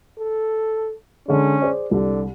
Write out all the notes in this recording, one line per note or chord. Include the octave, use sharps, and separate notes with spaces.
A4
D3 G#3 C#4
G#4 C5 D5
C2 D3